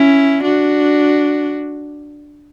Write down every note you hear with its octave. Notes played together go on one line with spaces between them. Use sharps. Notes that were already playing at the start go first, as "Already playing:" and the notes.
Already playing: C#4 E4
D4 F#4